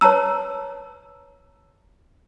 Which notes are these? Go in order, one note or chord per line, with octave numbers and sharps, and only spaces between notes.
B4 C#5 A5 A#5 E6